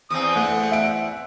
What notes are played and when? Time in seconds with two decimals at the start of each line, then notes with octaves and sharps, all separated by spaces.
0.10 E2 C4 D#6
0.36 A3 F#5
0.72 E5 D7